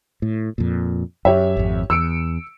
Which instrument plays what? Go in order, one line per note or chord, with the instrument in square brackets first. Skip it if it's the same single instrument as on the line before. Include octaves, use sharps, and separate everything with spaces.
[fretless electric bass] A2
F2 A#2
[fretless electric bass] F#2 [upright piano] G4 C#5 E5
[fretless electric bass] G#1 F2
[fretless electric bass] E2 [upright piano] E6 C#7 D7